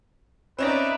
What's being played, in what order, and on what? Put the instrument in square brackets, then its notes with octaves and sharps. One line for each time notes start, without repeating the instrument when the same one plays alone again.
[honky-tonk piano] C4 C#4 A#6 [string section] D#4 D5 E5 [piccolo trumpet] B4